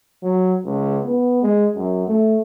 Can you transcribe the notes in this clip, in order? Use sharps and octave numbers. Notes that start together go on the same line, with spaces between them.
F#3
C#2
B3
G#3
F#2
A3